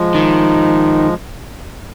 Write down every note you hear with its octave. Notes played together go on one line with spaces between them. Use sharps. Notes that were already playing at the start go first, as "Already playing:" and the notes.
Already playing: F3 G#3
D#3